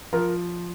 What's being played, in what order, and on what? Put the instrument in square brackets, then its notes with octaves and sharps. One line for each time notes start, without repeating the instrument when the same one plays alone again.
[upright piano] F3 F4 A#4